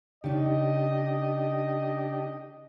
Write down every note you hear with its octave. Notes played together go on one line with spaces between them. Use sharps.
C#3 D4 D#4 G4 D#5